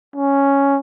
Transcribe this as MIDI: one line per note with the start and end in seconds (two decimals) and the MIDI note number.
0.16 0.79 61